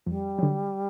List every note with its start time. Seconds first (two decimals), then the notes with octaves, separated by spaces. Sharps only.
0.06 F2 G3
0.39 D3 F#3